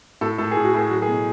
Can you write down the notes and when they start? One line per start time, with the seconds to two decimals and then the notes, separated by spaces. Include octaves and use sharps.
0.21 A2 A4
0.38 A2 A4
0.51 G#4
0.56 A2
0.64 F#4
0.74 A2 G#4
0.91 F#3 F#4
1.02 G#4
1.08 B2